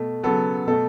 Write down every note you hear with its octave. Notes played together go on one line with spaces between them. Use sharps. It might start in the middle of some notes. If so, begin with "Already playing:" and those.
Already playing: B2 A3
C#3 F#3 B3 A4
B2 A3 A4